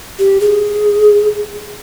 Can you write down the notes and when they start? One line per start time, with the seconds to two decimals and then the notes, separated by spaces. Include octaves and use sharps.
0.19 G4
0.41 G#4